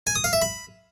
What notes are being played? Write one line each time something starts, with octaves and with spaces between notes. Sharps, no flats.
G#5
D#6
F5
E5
B5